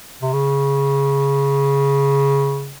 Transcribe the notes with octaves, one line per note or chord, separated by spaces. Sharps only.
C3
C#3